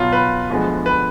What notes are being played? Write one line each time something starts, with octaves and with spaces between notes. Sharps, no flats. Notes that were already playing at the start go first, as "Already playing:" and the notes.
Already playing: B2 F#3 B3 F4
B4
D2 D3 F3 G#3 B3
B4